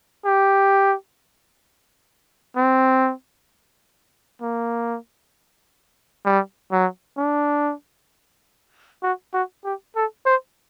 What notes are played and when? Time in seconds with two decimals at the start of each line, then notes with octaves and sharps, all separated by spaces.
0.25 G4
2.57 C4
4.42 A#3
6.25 G3
6.72 F#3
7.18 D4
9.03 F#4
9.33 F#4
9.65 G4
9.96 A4
10.26 C5